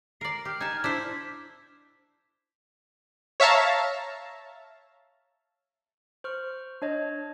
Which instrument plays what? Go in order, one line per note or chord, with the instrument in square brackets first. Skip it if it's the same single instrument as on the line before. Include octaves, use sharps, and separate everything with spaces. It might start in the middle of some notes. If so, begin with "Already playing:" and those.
[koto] A#4 D5 [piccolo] C7
[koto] G4 [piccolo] F6
[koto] D#4 A5 [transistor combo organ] G#5
[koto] D4 C5 [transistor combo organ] E4 [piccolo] B6
[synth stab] C#5 E5 F5 A5 A#5
[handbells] C5 C#6 F6
D4 C#5 D#5